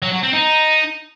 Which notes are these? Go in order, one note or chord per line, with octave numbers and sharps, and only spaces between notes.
F#3
F#3
C4
D#4